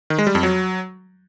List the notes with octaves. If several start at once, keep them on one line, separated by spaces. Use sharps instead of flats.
D#3
G#3
G3
F2
F#3